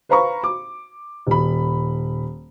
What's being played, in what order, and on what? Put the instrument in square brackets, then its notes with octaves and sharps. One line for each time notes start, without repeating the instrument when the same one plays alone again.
[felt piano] B4 C5 F5 A#5 B5 C#6
D6
D#1 B5